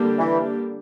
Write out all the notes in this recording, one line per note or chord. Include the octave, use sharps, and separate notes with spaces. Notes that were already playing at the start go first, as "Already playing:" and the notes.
Already playing: D3 G3 A#3 D4 G4
E3